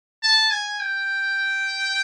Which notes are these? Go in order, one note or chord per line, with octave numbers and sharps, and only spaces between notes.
A5
G#5
G5